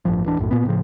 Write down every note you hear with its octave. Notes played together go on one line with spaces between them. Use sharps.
A1 G2 F3
D1 E3 D4
B1 F#2 A2
A#2 B3
A2 C#3 F3